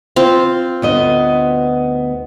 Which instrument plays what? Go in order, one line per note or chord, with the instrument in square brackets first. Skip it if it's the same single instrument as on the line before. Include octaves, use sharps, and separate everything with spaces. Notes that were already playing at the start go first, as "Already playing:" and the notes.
[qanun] C4 F4
[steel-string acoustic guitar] D2 B3 D#5